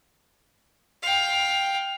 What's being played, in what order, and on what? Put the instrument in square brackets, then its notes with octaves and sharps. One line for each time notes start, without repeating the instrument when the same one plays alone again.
[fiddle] F5 G5